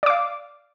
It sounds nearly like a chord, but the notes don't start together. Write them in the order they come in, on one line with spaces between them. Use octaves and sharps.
D5 D6 F5